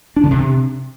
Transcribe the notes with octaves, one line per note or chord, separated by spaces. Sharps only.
D4
D3
C3